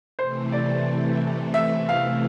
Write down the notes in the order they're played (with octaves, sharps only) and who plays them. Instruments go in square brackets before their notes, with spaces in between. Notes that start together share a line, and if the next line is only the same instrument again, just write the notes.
[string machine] C3 E3 A3 [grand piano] C5
[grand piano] D5
E5
F5